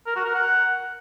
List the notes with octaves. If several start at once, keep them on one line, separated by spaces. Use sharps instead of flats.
A#4
F#4
A#4
F#5